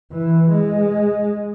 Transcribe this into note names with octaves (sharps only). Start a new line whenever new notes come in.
E3
G#3